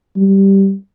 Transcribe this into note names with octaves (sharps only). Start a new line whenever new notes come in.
G3